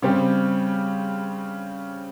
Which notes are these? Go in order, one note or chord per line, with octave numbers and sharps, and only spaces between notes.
C#3 G3 C4 G4